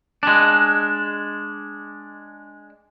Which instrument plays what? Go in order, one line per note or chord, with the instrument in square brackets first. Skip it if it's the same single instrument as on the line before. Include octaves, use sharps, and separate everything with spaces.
[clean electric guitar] G#3 D4